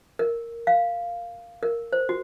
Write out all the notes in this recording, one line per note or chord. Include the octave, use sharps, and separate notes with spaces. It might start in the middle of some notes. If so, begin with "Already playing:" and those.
A#4
F5
A#4
C5
F#4